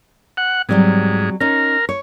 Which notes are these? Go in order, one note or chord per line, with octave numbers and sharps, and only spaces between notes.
F#5
G#2 F#3 G3 C4
C#4 D#4 A#4
C#5